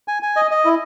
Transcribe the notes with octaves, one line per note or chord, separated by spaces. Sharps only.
G#5
G#5
D#5
D#5
E4